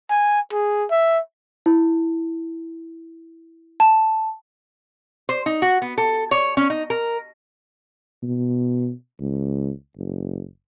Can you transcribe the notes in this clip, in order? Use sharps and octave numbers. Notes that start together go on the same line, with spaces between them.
G#5
G#4
E5
E4
A5
C5
D#4
F#4
B3
A4
C#5
C#4
D#4
A#4
B2
C#2
F#1